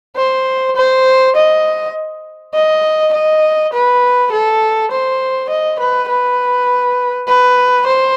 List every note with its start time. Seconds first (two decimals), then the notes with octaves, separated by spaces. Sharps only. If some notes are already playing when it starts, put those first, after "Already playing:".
0.16 C5
0.76 C5
1.36 D#5
2.54 D#5
3.13 D#5
3.73 B4
4.32 A4
4.91 C5
5.50 D#5
5.79 B4
6.09 B4
7.28 B4
7.87 C5